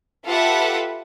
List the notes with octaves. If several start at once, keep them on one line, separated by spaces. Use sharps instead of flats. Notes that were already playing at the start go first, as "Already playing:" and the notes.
F4 G4 A4 B4 E5 F#5